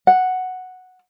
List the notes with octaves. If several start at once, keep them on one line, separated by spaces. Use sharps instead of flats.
F#5